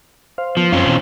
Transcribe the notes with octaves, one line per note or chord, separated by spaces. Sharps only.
C5 F5
F3 B3
F#2 C4 C#4 F4
B2 E3